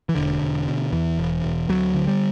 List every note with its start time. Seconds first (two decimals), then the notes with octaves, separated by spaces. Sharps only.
0.09 E3
0.15 E1 D3
0.42 E1
0.67 B2
0.92 E2 E3
1.18 E1
1.44 E1
1.69 D2 F#3
1.94 D3
2.08 G3